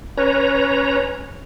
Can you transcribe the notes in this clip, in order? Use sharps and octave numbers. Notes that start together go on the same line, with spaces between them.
C#4 B4 C#5 A#5